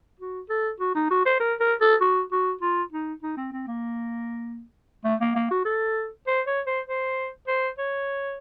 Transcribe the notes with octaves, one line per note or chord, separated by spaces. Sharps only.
F#4
A4
F#4
D#4
F#4
C5
A#4
A#4
A4
F#4
F#4
F4
D#4
D#4
C4
C4
A#3
A3
A#3
A#3
F#4
A4
C5
C#5
C5
C5
C5
C#5